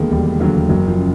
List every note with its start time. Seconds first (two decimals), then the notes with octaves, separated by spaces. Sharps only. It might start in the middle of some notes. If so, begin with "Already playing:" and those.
Already playing: E1 D#2 D3 G#3 A#3 B3
0.11 E1 G3
0.40 D#2 D3 F#3
0.69 F#1 F#3
0.88 F3
0.98 C#3